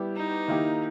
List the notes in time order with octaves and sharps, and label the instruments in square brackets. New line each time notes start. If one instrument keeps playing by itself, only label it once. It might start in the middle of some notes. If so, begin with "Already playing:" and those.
Already playing: [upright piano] G3 B3 E4 G4
[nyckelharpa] D#4
[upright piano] D#3 A#3 E4 G4